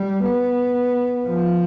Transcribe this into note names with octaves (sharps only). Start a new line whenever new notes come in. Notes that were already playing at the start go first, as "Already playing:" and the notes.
Already playing: G3
B3
F3